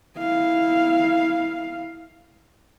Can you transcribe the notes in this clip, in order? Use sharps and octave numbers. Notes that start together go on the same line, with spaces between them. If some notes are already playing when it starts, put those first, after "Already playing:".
E4 F5